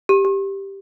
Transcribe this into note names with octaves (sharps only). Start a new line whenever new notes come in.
G4
G4